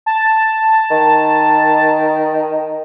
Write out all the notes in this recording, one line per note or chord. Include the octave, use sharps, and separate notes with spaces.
A5
D#3